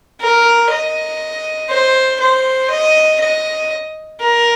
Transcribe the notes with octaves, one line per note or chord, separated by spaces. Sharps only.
A#4
D#5
C5
C5
D#5
D#5
A#4